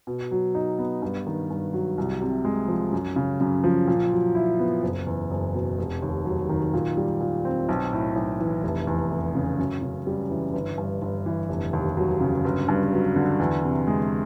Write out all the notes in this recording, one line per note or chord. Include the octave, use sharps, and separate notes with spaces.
B2
F#3
D#4
B3
G2
D#3
G2
F#3
C2
C3
G#3
F3
F#2
C#3
F#2
F3
A#2
F#3
E4
B3
F#1
E2
F#1
B2
F1
D#2
F#3
D#3
A#2
G3
A#2
C4
B1
A2
B1
E3
F1
E2
F1
C#3
F#2
C#3
G3
E3
G1
G2
G1
E3
F1
D#2
F#3
C#3
G1
G2
F#3
D3
E2
C3
G#3